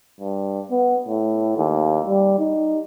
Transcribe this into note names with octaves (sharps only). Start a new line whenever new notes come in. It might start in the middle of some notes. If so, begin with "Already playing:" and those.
G2
B3
A2
D#2
G3
D#4